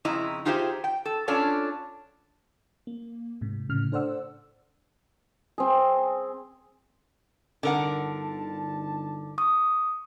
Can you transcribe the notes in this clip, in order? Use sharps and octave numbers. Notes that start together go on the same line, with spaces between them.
F2 C#3 C4 E4 D#5 A#5
D#4 F4 G4 G#4 C5 E5
G5
A4
C#4 D4 F4 A4 C#5
A#3
G#2 C3
A2 C#3 F6
D4 A4 C5 D5 F#5 E6
C4 G#4
G1 D3 D#4 A#4 F#5 A5
C#6 D#6